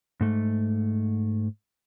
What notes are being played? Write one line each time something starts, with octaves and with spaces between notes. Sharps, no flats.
G#2 A3